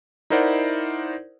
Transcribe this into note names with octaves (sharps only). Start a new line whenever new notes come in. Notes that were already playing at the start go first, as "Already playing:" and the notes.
D#4 E4 A#4 C5 D5 F#5